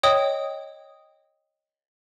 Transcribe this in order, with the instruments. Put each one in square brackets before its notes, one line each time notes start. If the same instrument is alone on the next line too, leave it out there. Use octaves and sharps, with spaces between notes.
[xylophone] C#5 D#5 G5 D#6